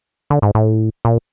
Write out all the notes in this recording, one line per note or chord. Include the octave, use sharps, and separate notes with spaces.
D3
G#2
A2
A#2